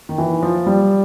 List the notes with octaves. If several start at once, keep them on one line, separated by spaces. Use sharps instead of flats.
D#3
E3
F3
G3